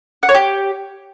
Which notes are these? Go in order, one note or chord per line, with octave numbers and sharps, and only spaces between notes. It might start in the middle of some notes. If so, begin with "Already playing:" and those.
F#5
C#5
G4